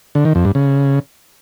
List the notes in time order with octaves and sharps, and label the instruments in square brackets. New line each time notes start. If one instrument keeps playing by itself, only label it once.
[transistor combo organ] D3
D#3
F2
G2
C#3